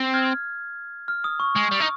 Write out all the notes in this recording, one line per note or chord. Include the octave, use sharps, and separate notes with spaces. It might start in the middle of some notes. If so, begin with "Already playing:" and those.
Already playing: C4
F6 G#6
F6
D#6
C#6
G#3
G3
D#4